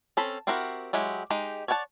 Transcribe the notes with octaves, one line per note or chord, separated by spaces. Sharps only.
C4 C#4 A4 B5
C4 E4 F#4 G4 A#4
F#3 G#3 E4 G4
G#3 D#4 G4
C#5 D5 F#5 G5 A5